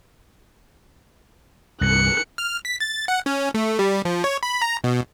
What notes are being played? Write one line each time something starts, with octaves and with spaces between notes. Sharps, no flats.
C2 G2 F#6 C#7
F6
B6
A6
F#5
C#4
A3
G3
F3
C#5
B5
A#5
B2